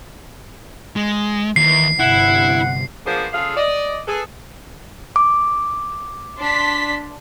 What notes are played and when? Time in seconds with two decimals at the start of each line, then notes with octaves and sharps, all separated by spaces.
0.96 G#3
1.56 D#2 E3 C7
1.99 G1 C3 E4 F#5
3.05 F3 A#3 B3 D4 G#4 C5
3.32 C#3 F4 G#4 A4 F5
3.56 D5 D#5
4.07 G#4 A4 B4
5.16 D6
6.39 D4 C6 B6